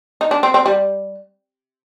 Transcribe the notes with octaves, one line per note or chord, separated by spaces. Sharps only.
D#4
D4
C4
C4
G3